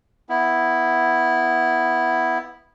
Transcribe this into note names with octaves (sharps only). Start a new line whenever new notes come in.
B3 E4